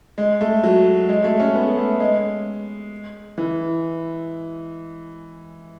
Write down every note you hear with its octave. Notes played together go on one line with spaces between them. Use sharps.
G#3
A3
F#3
G#3
A3
C#4
B3
A3
G#3
E3